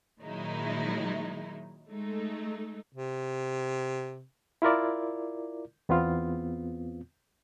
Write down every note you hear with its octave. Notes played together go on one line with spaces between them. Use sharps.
A#2 D#3 F#3 G#3 D#4 E4
G#3 A3 D#4
C3
E4 F4 A#4 D5
E2 B3 C4 F4